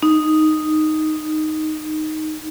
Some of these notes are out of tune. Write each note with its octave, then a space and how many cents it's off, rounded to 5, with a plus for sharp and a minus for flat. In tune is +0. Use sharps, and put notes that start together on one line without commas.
D#4 -5